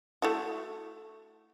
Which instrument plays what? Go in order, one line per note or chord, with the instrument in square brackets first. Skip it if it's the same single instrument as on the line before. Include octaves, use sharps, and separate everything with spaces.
[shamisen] A3 E4 F#4